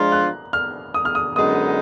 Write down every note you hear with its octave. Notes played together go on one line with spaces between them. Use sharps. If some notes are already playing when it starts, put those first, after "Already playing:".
Already playing: F3 G#3 D4 F4 A#5
F#6
F6
D#6
F6
D#6
F#2 D3 G#3 B3 D#4 D#6